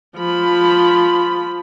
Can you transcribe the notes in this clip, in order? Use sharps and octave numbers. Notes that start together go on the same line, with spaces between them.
F3 B5